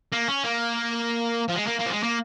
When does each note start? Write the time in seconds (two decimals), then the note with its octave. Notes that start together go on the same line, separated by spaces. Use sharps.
0.12 A#3
0.28 C#4
0.44 A#3
1.48 F3
1.55 G#3
1.66 A#3
1.79 A#3
1.86 F3
1.91 G#3
2.03 A#3